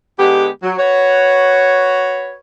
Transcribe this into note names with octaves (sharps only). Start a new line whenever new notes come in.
D3 G#3 B3 G4
F#3
F#4 B4 C#5